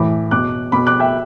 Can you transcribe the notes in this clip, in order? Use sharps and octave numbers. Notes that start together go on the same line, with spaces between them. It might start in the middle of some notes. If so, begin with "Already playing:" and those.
Already playing: A2 E3 B5 D6
B2 D6 F#6
B2 B5 D6
D6 F#6
E5 G5